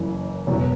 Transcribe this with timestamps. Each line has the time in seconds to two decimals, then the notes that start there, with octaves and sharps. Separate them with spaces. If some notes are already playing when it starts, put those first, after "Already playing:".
Already playing: F#1 F#2 E3
0.47 E1 E2 B2 F#3 B3